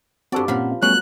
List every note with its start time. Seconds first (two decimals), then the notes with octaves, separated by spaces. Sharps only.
0.32 G2 C4 F#4 A4 D5 F#5
0.48 A#2 F3 C4 C#4 A#4 F5 F#5 B5
0.82 F#3 G3 A3 B3 C#4 F#6